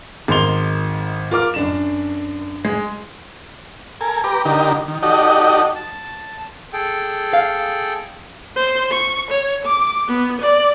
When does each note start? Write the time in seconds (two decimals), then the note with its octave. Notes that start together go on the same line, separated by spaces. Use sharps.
0.28 G#1 D#4 A#4 C6 F7 G7
1.31 F4 A#4 D6 F6
1.54 F#2 D4 E7
2.65 G#3
4.01 A4 A#4 G#5
4.24 G4 B4 A#5 D6
4.45 D3 D#4 G4 A#4
4.88 D#3
5.03 D#4 F#4 G4 A4 D5 D#5
5.75 A5
6.73 G#4 A4 G5
7.33 F5
8.56 C5
8.91 C#6
9.31 C#5
9.65 D6
10.07 B3
10.41 D5